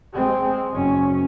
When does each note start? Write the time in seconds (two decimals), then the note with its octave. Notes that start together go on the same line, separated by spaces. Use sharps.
0.13 G#3 C4
0.73 F#1 C#4